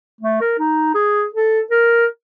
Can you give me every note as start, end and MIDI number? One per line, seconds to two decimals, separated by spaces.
0.21 0.39 57
0.41 0.54 70
0.59 0.94 63
0.95 1.25 68
1.34 1.61 69
1.71 2.06 70